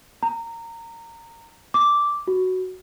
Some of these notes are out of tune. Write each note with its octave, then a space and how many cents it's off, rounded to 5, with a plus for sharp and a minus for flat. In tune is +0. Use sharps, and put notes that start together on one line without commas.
A#5 -20
D6 -10
F#4 +5